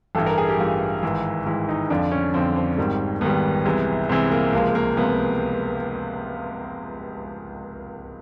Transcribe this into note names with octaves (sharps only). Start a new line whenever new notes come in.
A1 G2 E3 A4
A#4
G#4
G4
A1 G2 E3 F4
G#1 G#2 E3
G#1 G#2 E3 E4
D#4
F2 D3 F3 D4
C#4
F2 D3 F3 C4
C4
G#1 G#2 D#3 G3
G#1 G#2 D#3 G3 B3
C2 C3 E3 G#3
C2 C3 E3 G#3 C4
A#3
C#2 C3 F3 G#3 A#3
A#3
C#2 C3 F3 G#3 B3